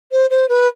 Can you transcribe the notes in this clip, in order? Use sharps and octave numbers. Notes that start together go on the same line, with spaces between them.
C5
C5
B4